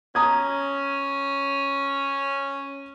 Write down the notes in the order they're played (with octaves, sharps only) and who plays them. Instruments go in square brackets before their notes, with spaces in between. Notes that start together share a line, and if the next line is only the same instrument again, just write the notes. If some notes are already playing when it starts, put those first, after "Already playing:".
[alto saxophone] C#4 [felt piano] A#5 D#6 G#6